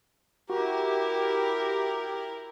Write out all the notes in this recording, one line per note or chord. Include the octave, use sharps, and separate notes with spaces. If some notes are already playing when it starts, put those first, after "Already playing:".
E4 F#4 G4 A#4